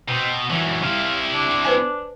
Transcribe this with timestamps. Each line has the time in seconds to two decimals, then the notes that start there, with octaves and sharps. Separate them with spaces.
0.08 B2 C4
0.50 F#2 E3 C#5
0.83 C3 E4 F5
1.33 D4
1.65 B4 C5 G#5